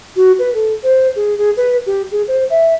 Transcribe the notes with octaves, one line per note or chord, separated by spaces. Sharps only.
F#4
B4
A4
C5
G#4
G#4
B4
G4
G#4
C5
E5